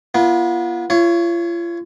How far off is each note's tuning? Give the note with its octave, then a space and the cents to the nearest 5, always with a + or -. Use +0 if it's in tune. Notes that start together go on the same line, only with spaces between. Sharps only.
B3 -35 F4 -35
F4 -40 C#5 +5